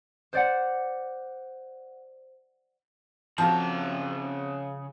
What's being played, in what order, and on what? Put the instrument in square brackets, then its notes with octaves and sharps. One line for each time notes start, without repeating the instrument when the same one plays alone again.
[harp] C5 D5 F#5
[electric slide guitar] C#3 A#5 [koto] F3 [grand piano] C4 F#4 A4